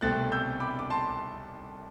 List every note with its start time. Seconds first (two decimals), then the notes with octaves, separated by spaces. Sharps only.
0.01 C2 B2 A3 C4 F#6 A6
0.32 E6 G6
0.60 B5 D6
0.79 D6
0.90 A5 C6